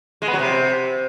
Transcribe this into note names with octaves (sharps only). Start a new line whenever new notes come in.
G#3
B3
F#3
C3